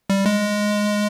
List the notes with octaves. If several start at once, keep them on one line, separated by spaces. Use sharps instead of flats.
G3
G#3